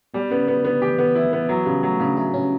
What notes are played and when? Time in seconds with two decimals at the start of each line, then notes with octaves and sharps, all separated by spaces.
0.14 B2 G3
0.30 C#3 B3
0.48 C#3 B3
0.64 D3 B3
0.82 E3 G4
0.99 B3
1.05 E3
1.15 E4
1.27 E3
1.33 B3
1.49 E3 F#3
1.65 C#3 G3
1.83 F#3 A3
2.00 C#3 D4
2.17 F#3 E4
2.33 C#3 C#4